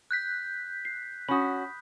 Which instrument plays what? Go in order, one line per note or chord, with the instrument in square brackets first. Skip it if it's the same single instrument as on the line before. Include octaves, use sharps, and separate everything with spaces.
[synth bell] F#6 G6 B6
[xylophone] C7
[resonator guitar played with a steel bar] C#4 F#4 [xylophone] B5 D#6